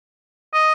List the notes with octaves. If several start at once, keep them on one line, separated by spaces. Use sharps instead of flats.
D#5